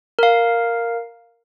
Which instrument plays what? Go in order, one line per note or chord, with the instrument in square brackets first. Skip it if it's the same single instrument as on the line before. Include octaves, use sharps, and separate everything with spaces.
[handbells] A#4 F5